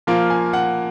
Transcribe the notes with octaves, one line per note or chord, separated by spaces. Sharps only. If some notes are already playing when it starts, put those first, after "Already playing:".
F3 A#3 F4
G#5
F#5